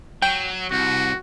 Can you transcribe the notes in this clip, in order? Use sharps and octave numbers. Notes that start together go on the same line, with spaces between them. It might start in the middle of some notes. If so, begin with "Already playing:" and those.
F#3 G5
C2 F#4